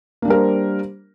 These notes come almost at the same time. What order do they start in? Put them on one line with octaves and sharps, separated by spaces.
A#3 D4 G3 A#4 C5